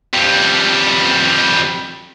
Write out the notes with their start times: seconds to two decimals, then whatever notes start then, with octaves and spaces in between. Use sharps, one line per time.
0.14 F2 G3